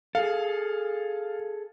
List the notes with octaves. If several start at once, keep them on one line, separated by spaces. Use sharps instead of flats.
G#4 A4 F5